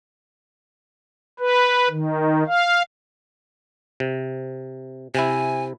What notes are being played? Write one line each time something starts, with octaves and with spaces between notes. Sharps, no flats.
B4
D#3
F5
C3
C3 E4 G#5